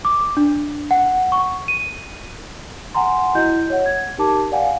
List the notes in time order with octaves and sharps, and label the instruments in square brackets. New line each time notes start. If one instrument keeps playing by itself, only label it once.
[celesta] D6
D4
F#5
C#6
D#7
F#5 G#5 A#5 C6
E4 F#4 D#5 G6
C#5 F#5
G#6
D#4 G4 A#4 A5 D6
D5 F5 F#5 G#5